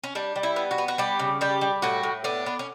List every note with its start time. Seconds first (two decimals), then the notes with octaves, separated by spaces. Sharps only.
0.04 C#4
0.15 G3 D4
0.36 G3
0.43 E4
0.56 B3
0.71 F#4
0.78 B3
0.88 F#4
0.98 G3 G4
1.19 C#3
1.41 G3 G4
1.61 G3
1.82 A2 F#4
2.03 A2
2.24 B3 D4
2.46 B3
2.59 C#4